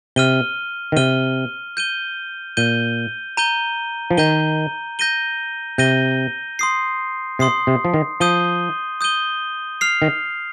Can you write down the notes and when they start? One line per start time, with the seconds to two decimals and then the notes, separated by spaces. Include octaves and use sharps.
0.16 C3 F6 D#7 G7
0.92 D#3
0.96 C3 F6 D#7 G7
1.77 G6 D#7 G7
2.57 A#2 G6 D#7 G7
3.37 A#5 G6 D#7 G7
4.11 F3
4.18 D#3 A#5 G6 D#7 G7
4.99 G6 A#6 D#7 G7
5.78 C3 G6 A#6 D#7 G7
6.59 C6 D#6 C7
7.39 C3 C6 D#6 C7
7.67 C3
7.85 F3
7.94 D#3
8.20 F3 D#6 G6 D#7 G7
9.01 D#6 G6 D#7 G7
9.81 F6 C7 F7
10.02 D#3